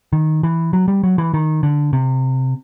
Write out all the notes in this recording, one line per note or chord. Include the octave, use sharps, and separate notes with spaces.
D#3
E3
F#3
G3
F#3
E3
D#3
D3
C3